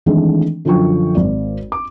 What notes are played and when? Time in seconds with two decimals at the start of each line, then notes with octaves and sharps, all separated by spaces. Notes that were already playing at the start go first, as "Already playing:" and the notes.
0.06 D#3 E3 G#3 A3 C4 D4
0.65 F#2 D3 F3 F4 G5 C#6
1.15 G#1 D5
1.72 D6